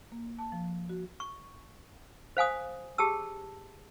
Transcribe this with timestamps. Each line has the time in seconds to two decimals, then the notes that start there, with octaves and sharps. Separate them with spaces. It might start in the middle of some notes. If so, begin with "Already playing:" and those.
0.12 A#3
0.39 A5
0.52 F3
0.89 F#4
1.20 C#6
2.37 C5 F5 G#5 D#6
2.98 G4 G#4 A5 E6